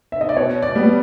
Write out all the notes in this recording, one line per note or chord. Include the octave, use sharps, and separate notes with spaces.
E5
D#5
D5
B2 C#5
D5
G3 B3